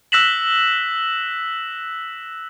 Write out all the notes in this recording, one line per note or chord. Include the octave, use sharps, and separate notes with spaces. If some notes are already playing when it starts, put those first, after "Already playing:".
E6 F#6 A#6 B6 E7 F#7